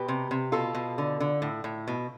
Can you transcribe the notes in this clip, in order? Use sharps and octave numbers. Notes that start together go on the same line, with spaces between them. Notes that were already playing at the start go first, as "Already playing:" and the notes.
Already playing: B2 G4 B4
C3
C3
B2 F4 A4
B2
D3
D3
A2
A2
B2